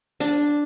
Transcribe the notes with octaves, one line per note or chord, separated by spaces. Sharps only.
D4